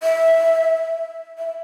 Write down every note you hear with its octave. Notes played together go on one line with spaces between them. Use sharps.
E5
E5